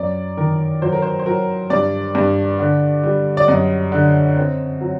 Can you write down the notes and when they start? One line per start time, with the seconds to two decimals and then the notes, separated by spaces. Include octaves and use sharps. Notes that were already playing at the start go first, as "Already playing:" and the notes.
Already playing: F#2 D5
0.37 D#3 A#4
0.82 F#3 C5
0.92 A#4
1.02 C5
1.19 C5
1.26 F#3 A#4
1.70 G2 D5
2.15 G2
2.59 D3
3.04 G3
3.37 D5
3.48 F#2 D#5
3.92 D3
4.36 C4
4.81 F#3